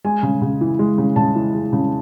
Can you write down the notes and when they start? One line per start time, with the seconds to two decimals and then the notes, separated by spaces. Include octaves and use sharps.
0.04 G#3 G#5
0.23 C#3
0.41 C#3
0.61 E3
0.79 G#3
0.98 C#3
1.16 C#3 A5
1.35 E3
1.54 G#3
1.73 C#3